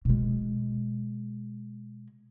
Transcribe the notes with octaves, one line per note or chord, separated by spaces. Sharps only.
B2 G#3